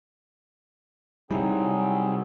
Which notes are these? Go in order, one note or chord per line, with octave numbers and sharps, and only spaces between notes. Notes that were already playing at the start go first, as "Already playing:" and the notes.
C3 F#3 G3 C4 D#4 E4 G#4